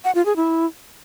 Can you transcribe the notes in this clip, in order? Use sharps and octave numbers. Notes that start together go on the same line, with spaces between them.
F#5
F4
G#4
E4